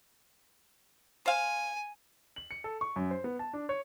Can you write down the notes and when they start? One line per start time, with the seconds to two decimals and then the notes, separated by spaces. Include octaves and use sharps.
1.26 C5 F5 G#5
2.36 F#7
2.51 C#7
2.64 A4
2.81 C#6
2.96 F#2
3.11 C5
3.24 B3
3.39 A5
3.53 D4
3.69 C#5